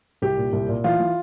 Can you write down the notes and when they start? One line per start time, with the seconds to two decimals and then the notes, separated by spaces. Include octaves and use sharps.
0.22 C2 G4
0.37 A#2
0.53 C2
0.69 A#2
0.84 E3 F4
1.00 E3